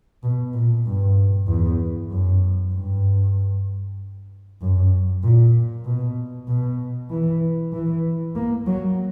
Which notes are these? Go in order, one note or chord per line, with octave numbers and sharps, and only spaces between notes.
B2
A#2
G2
E2
F#2
G2
F#2
A#2
B2
B2
E3
E3
A#3
F#3